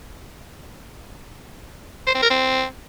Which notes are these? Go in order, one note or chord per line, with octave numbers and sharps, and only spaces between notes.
C5
C4
A#4
C4